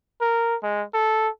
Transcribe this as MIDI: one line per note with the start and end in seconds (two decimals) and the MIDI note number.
0.21 0.56 70
0.63 0.84 56
0.94 1.29 69